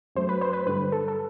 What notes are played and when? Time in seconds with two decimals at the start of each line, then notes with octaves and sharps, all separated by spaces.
0.15 F#2 F#3 A3 C5
0.29 B4
0.41 C5
0.53 B4
0.66 G2 D3 G3 B4
0.92 A4
1.08 A4